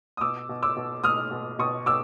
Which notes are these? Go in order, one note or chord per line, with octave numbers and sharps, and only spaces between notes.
D#6
B2 D6 E6
B2
D6 E6
B2
B2 D#6 F6
B2
B2 C#6 D#6
B2 D6 E6